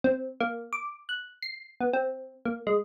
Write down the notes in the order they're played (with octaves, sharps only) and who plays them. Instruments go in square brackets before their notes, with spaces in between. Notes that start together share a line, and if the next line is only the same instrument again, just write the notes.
[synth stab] C4
A#3
D6
F#6
C7
B3
C4
A#3
G#3